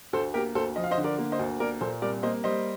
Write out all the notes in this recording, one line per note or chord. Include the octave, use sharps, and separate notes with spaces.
D2 A4 C5
A#3 G4 A#4
D2 A4 C5
F3 D#5
F5
C5 D#5
D3
A#4 D5
A#3
C5 D#5
D2
A#3 A#4 D5
A#2 A4 C5
C2 A#4 D5
A#3 C5 D#5
G3 C5 D#5